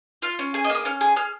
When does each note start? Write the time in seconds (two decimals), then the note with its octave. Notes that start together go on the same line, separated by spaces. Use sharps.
0.22 F4 F5
0.39 C#4
0.54 G#4 G#5
0.64 D#5
0.70 A#3
0.75 D#6
0.85 C#4 F6
1.01 G#4
1.16 G#4 F6